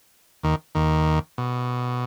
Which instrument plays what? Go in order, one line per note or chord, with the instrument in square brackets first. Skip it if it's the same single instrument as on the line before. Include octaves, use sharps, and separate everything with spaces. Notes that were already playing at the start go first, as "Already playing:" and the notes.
[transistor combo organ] D#2 D#3
D#2 D#3
B2